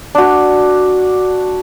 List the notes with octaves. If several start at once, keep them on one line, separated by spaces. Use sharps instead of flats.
D4 F#4